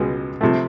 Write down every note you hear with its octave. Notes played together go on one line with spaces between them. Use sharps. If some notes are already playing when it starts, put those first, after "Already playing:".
Already playing: C#2 B2 G#3
C3 F3 A3